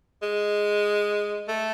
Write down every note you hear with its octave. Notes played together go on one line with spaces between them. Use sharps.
G#3
A3